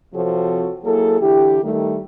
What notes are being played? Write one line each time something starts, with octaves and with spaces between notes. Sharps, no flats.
C3 F3 C4 F#4 A4 C#5
F#3 A#3 E4 G#4 A4
D3 E3 E4 G4
D#3 G3 A3